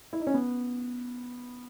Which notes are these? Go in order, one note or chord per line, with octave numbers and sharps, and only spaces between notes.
E4
D#4
C#4
B3